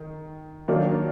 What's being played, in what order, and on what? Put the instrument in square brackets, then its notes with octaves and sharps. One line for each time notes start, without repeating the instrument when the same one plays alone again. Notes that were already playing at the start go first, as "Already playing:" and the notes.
Already playing: [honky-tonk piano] D#3
D#3 F#3 A#3 D4